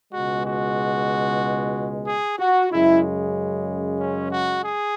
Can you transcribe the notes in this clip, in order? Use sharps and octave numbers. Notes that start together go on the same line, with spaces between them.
C#2 B2 G#3 F#4
F#4
G#4
F#4
F#2 C#3 G#3 E4
C#4
F#4
G#4